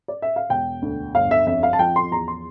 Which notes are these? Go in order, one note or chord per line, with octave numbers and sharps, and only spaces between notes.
D5
E5
F5
E1 G5
D2
G1 F5
E5
F2 E5
F5
A5
F3 G5
C6
E2 A#5
C6